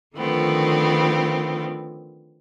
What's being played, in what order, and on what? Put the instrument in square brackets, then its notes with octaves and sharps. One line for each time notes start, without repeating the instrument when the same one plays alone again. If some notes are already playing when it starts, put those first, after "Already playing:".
[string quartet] D3 D#3 F3 A3 B3 C4